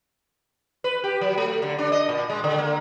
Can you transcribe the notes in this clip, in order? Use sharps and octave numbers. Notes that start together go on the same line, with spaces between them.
B4
G4
F#3
A3
D3
D4
D#5
A#2
G#3
D3
A#3